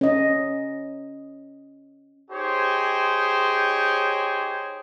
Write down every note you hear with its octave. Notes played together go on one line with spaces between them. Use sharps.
C#4 D#5
D#4 G4 G#4 C5 C#5